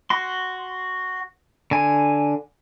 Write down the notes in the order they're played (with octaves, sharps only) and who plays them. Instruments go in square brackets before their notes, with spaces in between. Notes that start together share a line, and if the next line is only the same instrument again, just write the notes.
[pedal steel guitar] F#4 C6
D3 G#5